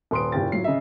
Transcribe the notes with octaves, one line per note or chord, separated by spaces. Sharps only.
D#1 B4 C6 D#6 D7
F#1 A#2 G4 A6
A2 F#3 F4 C7
C#3 D#5 E5